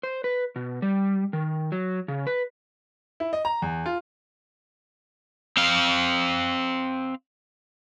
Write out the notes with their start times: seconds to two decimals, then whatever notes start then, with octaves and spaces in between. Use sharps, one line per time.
0.03 C5
0.24 B4
0.56 B2
0.82 G3
1.33 D#3
1.72 F#3
2.08 C#3
2.27 B4
3.20 E4
3.33 D#5
3.45 A#5
3.62 E2
3.86 F4
5.57 C4 F5